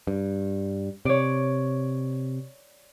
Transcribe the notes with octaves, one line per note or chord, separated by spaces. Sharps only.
G2
C3 C#5 D5